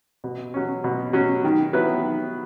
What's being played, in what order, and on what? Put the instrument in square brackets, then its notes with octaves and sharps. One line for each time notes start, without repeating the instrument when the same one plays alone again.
[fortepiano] B2
F#3 C#4
B2
F#3 C#4
D#3
F#3 B3 E4 B4
D#3